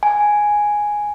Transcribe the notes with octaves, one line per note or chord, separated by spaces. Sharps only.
G#5